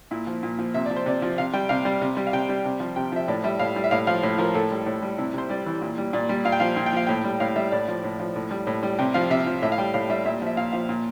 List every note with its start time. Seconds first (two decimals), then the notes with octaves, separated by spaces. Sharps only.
0.11 A#2 E4
0.27 F3
0.43 A#2
0.59 F3
0.74 C3 E5
0.85 F3 D5
0.96 C5
1.06 C3 D5
1.22 F3
1.38 C3 F5
1.53 G3 G5
1.69 C3 F5
1.85 G3
2.01 C3
2.17 G3
2.27 F5
2.33 C3 G5
2.49 G3
2.65 C3
2.80 F3
2.96 C3 G5
3.12 F3 E5
3.28 A2 D5
3.44 G3 E5
3.59 A2 F5
3.76 G3
3.84 E5
3.91 A2 F5
4.07 F3 F5
4.23 A2
4.38 F3 A#4
4.54 A2 A4
4.71 G3
4.86 A2
5.02 G3
5.18 C3 E4
5.34 C3 C5
5.50 G3 D5
5.66 E3
5.82 A#2
5.98 G3
6.13 A#2 D5
6.29 G3
6.45 A#2 F5
6.52 G5
6.60 F3 F5
6.77 A#2
6.86 G5
6.93 F3 F5
7.07 A2 G5
7.24 G3
7.40 A2 F5
7.56 G3 E5
7.72 A2 D5
7.88 F3
8.04 A2
8.20 F3
8.36 A2
8.51 G3
8.67 A2
8.83 G3
8.99 C3 G5
9.14 F3 F5
9.30 C3 E5
9.46 F3
9.62 A2 E5
9.72 F5
9.78 G3 G5
9.94 A2 F5
10.10 G3 E5
10.25 A#2 E5
10.42 F3 E5
10.57 A#2 F5
10.73 F3 F5
10.89 A#2